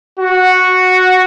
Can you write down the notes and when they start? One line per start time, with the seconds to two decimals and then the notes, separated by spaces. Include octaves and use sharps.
0.19 F#4